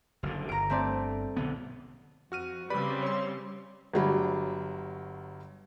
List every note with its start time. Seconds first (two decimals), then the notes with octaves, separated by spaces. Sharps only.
0.23 F#1 F#2 D3
0.49 G1 A#5 D7
0.70 A3 C4 D5
1.37 B1 D3 B3
2.32 F2 F#4 F6 D#7
2.70 C#3 G3 C4 B4 D5 B5
3.03 C#5 C6
3.93 G1 F#3 G3